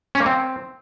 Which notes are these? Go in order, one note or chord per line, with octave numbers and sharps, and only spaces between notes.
C#4
A#3
C4